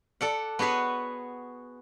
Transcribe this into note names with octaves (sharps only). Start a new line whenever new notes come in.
A4 D5 F#5
B3 F#4 G#4 B4 C#5